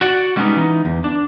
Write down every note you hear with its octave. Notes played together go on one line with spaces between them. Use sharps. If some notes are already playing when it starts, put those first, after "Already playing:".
F#4 D5 F#5
G3 G#3 A#3 B3 C#4 D#4
E3 D#4
E2
D4